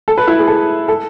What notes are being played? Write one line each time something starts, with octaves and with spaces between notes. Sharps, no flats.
A4
B4
E4
G#4
A4
A4